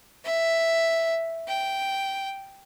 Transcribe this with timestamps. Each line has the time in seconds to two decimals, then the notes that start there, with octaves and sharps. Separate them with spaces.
0.24 E5
1.48 G5